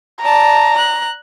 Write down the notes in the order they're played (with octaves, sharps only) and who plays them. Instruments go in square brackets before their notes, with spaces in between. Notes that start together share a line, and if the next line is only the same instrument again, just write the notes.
[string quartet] D5 A5 [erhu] A#5
[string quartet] F#6